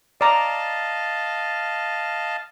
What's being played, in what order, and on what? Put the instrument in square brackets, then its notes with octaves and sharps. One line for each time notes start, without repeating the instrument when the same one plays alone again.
[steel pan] D5 A#5 [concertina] D#5 F5 A5